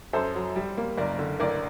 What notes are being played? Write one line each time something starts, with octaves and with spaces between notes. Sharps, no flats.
F#2 A4 C5
F#3
G3
A#3
F#1 A#4 D5
D3
A1 A#4 D5